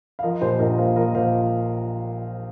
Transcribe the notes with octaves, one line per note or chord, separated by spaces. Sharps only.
F5
F3 A#4 D#5
A#2 G4 C5
A#1 A#4 D#5
A#3 C5 F5
F3 A#4 D#5
A#2 C5 F5